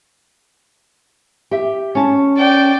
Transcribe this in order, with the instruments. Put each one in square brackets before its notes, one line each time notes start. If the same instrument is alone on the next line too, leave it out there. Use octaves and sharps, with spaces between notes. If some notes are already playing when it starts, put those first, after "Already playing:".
[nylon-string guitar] G4 E5
C#4 A5
[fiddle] D5 G5